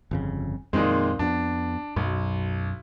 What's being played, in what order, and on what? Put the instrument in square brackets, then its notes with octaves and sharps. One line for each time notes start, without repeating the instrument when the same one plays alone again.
[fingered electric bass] G1 F2 C#3
[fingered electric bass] F2 C4 [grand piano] A#2 D#3 G#3
[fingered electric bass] F2 A#3 B3 [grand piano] D4
[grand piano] B1 [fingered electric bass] F#2